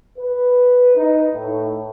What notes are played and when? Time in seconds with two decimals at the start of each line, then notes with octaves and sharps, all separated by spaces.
0.19 B4
0.95 D#4
1.33 A2